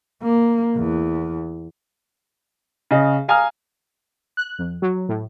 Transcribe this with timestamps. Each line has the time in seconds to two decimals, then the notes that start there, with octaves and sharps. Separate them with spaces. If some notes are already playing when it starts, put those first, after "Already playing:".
0.23 A#3
0.76 E2
2.91 C#3 D#5
3.28 F5 G#5 A#5 D#6 F6
4.37 F#6
4.59 F2
4.82 F#3
5.09 A2